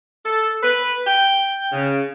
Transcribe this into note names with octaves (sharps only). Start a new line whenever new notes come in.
A4
B4
G5
C#3